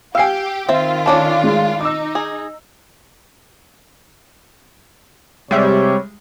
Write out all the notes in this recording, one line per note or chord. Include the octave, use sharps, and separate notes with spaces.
G4 F5 G#5 E6 C7
D#3 C4 F4 E5
C#4 D4 A4 A5 D6
G#3
D#4 D6 E6
G#4
C3 G3 G#3 C#5 E5